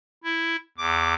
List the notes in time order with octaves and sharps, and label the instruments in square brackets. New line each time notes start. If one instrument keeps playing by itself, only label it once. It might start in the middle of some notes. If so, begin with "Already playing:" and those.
[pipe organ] E4
E2 D6